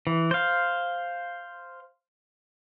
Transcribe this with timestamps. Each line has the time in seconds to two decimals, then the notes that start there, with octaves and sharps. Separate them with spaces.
0.07 E3
0.31 C5 F5